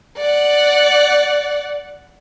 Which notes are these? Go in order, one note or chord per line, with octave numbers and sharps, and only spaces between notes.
D5 F#5